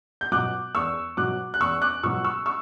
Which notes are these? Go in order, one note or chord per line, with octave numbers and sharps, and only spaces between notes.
G6
B2 F#3 D6 F#6
E2 C#6 E6
B2 F#3 D6 F#6
F#6
E2 C#6 E6
D6 F#6
B2 F#3 C#6 E6
C#6 E6
C#6 E6